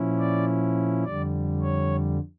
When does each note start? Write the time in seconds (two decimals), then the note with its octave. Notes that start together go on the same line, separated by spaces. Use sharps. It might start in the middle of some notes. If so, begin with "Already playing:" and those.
Already playing: A#2 F3 C#4 E4
0.19 D5
1.05 F2 D3 G3 D5
1.61 C#5